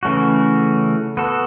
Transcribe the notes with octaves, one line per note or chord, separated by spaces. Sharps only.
C#3 E3 A3 C#4 F#4
B3 F#4 A4